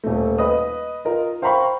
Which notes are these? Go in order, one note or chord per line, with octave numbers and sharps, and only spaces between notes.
D#1 A3
B4 D#5 D#6
F4 A#4 D#5
C5 F5 G5 A#5 B5 C#6